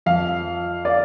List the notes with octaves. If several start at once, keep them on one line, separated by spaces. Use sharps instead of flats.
F2 F3 F5
D5
F5